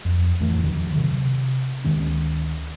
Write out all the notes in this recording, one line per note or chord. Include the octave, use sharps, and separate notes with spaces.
F2
D1 F2 E3 A3
E2 D3 D#3 F3
C3 D#3 F#3
C3
D2 D#3 G#3 C#4